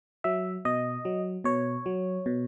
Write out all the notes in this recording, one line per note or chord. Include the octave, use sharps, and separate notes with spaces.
F#3 E5
B2 D#5
F#3
B2 C#5
F#3
B2